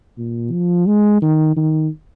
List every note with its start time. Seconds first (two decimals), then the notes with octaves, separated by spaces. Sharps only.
0.18 A#2
0.52 F3
0.87 G#3
1.22 D#3
1.57 D#3